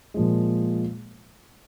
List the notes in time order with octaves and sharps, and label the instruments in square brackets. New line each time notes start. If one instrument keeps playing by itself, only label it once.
[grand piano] A#2 F3 G#3